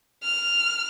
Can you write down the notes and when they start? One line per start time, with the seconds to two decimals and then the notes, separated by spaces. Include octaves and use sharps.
0.23 F6